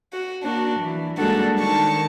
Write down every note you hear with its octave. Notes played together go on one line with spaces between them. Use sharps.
F#4
A#3 D4 F#4
E3
G3 G#3 A#3 D4 F#4 A4
D#3 A5 C#6